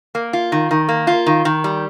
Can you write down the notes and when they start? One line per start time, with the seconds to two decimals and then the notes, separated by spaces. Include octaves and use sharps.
0.15 A#3
0.33 F4
0.52 D#3
0.71 D#3
0.89 A#3
1.07 F4
1.26 D#3
1.45 D#3
1.64 G3